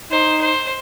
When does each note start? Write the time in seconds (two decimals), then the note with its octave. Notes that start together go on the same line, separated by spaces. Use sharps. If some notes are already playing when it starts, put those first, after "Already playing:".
0.11 D#4 C5
0.41 C5